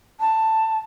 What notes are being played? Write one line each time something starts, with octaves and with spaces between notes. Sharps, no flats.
A5